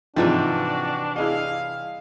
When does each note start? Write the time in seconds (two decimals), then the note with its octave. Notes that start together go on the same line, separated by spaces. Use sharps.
0.16 G#1 C3 E3 F3 G3 D4 D#4 F#4
1.16 E4 G#4 D#5 F5